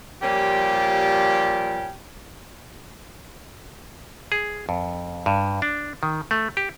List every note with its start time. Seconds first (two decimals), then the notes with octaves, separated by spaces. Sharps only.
0.22 A#2 F3 G3 C#4 G4
4.32 G#4
4.69 F2
5.26 G2
5.62 D4
6.03 D#3
6.31 A3
6.57 G4